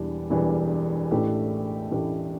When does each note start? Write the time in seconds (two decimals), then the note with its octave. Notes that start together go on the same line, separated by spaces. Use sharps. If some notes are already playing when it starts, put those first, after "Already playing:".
Already playing: E1 E2 E3 G3 D4
0.30 E1 E2 E3 G3 D4
1.11 A1 A2 A3 D4 G4
1.92 A1 A2 A3 D4 G4